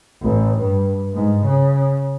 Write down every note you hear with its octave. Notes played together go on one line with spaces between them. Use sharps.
A1
G2
G#2
C#3